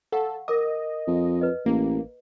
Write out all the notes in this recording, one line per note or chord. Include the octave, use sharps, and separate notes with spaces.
A4 F5 F#5 C#6
A#4 D#5 D6
F2
B4 D#5
A1 A#3